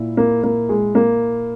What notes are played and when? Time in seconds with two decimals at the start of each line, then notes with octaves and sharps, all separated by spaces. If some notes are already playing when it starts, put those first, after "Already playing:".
Already playing: A#2 E4
0.17 A#3
0.43 A#3
0.69 G#3
0.95 A#3